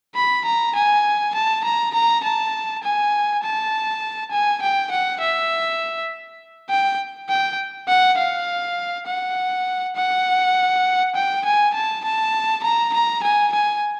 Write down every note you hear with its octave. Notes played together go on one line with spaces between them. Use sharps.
B5
A#5
G#5
A5
A#5
A#5
A5
G#5
A5
G#5
G5
F#5
E5
G5
G5
F#5
F5
F#5
F#5
G5
G#5
A5
A5
A#5
A#5
G#5
G#5